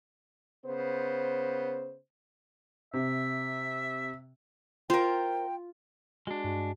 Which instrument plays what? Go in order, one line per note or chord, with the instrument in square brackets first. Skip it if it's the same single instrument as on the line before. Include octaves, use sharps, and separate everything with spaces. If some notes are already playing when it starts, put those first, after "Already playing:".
[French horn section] C#3 B3 C5
[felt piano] C3 [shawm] E5
[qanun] F4 [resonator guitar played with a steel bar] A#4 C5 [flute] G5
[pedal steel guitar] G#3 D4 [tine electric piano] F#4
[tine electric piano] G2 F#4